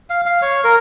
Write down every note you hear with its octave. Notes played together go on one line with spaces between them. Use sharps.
F5
F5
C#5
A#4